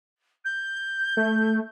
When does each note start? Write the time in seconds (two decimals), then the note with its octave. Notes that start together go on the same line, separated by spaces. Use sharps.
0.44 G6
1.17 A3